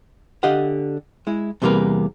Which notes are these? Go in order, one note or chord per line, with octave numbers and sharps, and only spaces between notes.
D3 G4 D#5 F5 F#5
G#3 E4
E2 C3 G3 A#3 A#4 B4